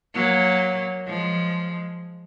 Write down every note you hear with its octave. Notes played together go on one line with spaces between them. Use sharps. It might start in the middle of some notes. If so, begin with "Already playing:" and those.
F#3 A#3
F3 G#3